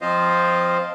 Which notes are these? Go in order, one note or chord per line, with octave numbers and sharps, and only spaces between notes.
F3 C4 F4 C5 D#5 F5